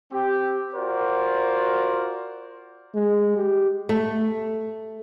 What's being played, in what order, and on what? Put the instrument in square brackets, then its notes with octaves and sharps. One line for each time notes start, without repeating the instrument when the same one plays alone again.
[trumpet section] C4 G4
F4 F#4 A#4 C5 D5
[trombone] G#3
G4
[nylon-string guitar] A3